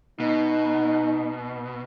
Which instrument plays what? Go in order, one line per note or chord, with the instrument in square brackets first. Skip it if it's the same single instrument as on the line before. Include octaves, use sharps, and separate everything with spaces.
[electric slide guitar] B2 [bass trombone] D#4